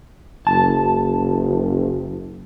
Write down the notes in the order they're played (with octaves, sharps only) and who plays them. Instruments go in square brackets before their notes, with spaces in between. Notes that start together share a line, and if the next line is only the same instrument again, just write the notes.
[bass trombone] F#1 [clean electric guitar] A5